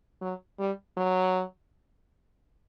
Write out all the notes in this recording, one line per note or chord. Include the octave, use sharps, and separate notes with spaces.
F#3
G3
F#3